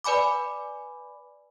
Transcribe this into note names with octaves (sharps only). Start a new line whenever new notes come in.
B4 D5 G#5 B5 D6